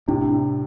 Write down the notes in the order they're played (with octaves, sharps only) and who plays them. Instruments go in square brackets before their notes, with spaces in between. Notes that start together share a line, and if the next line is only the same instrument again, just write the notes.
[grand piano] A2 C3 [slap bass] D4